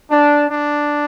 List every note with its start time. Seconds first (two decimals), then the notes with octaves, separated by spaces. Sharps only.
0.11 D4
0.50 D4